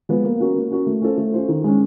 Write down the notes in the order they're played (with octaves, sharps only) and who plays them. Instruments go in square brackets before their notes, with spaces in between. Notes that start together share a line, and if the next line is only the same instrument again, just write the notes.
[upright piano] F3 G#3 B3
A#3
C#4 F#4 A#4
A#3
C#4 F#4 A#4
A3
C#4 F4 A4 C5
A3
C#4 F4 A4 C5
D#3
G#3 C#4